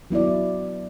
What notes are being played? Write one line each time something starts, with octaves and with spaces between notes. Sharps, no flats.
F#3 B3 E4 D5